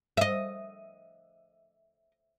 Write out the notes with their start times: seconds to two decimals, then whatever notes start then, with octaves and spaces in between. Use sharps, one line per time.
0.17 D#5 E5